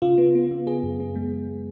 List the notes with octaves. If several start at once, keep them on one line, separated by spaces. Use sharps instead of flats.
C#3 F4
B3
B3
C#3
B3 G#4
F#2
B3
G#3